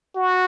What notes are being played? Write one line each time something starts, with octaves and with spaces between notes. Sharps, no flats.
F#4